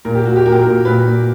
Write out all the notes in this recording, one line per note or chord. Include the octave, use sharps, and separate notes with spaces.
A#2 A#4
G4
A#2 F#4
G4
A#2 A#4
G4
A#4
A#2
A#2 B4
A#2